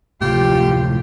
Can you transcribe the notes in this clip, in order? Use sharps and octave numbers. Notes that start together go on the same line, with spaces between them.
D2 A2 C3 F3 A3 F4 G4